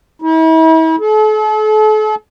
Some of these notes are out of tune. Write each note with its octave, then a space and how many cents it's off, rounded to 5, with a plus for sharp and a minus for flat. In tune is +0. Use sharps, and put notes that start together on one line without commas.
E4 -40
A4 -40